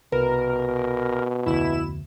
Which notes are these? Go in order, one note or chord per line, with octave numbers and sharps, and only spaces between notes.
C2 B2 A#4 B4
F1 D2 E4 E7